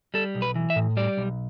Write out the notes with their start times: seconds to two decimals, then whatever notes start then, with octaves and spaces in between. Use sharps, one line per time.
0.14 G3 A4
0.35 B1
0.42 B4
0.56 E3
0.70 E5
0.76 A2
0.97 G3 D5
1.17 B1